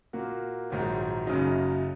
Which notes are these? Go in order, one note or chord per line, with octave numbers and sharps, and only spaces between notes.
A#2 A#3 F#4
A#1 G#2 D#3 F#3
F#1 F#2 C#3 F#3 D#4